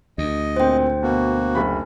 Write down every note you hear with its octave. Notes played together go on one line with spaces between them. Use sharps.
D2 D#5
A#2 C4 C5 G5
B2 A#3 F#4
F#1 B5